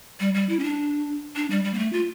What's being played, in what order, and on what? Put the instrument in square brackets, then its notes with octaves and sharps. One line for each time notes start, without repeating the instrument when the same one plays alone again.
[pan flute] G3
G3
E4
C#4
D4
D4
G3
G3
A#3
A3
F4